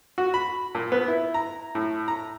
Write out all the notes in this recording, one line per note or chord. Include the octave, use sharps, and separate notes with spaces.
F#4
B5
A#2
B3
E4
A#5
A2
A#5